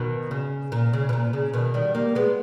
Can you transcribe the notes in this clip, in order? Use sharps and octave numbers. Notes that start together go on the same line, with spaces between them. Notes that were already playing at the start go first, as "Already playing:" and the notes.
Already playing: B2 D#3
C#3
A#2
C#3
B2
A#2
C#3
B2 D#3
D#3 G3
G3 A#3
G#3 B3